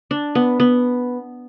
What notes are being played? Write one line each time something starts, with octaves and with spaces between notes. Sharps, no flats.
D4
B3
B3